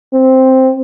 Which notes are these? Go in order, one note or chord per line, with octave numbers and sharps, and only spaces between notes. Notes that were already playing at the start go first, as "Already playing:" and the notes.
C4